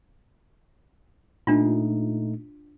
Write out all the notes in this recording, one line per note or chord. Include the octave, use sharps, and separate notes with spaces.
A#2 A3 D4 D#4 F4